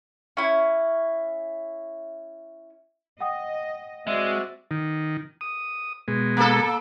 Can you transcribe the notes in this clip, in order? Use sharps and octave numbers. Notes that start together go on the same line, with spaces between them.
C#4 E4
D#5 F#5 G5 D#6
G#3 C4 F#4 D5 E5
D#3
D#6
B2 G#3
A#3 A4